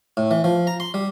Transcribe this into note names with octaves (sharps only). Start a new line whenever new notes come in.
A2
E3
F3
A#5
C6
G3